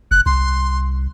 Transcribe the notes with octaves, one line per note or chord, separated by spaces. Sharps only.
F#1 F#6
C2 C6